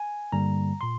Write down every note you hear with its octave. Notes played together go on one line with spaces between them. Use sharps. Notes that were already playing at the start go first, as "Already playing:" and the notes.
Already playing: G#5
G2 D3 G3 A#3 A#5
A#2 C6